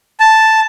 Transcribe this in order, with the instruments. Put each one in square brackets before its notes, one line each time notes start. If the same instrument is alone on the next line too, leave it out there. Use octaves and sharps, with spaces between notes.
[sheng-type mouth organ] A5